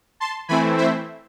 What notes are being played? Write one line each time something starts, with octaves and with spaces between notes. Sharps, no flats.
A5 C6
E3 A3 C4 E4 G#5 B5
C5 E5